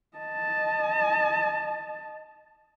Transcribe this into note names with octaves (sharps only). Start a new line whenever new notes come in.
D#5 A5